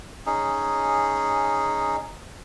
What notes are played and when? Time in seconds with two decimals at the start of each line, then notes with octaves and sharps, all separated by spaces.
0.26 C#4 D#4 G#4